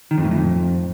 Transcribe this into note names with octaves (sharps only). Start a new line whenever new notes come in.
D#3
F2
A2
F2